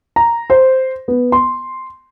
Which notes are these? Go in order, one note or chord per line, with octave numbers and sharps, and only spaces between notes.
A#5
C5
B3
C6